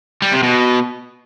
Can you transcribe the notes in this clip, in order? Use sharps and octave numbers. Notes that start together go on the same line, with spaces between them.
G3
C3
B2